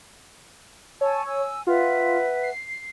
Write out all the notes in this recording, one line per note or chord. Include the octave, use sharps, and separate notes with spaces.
C#5 G#5 A5 E6
G#5 E6
F4 B4 E5 F#5
C7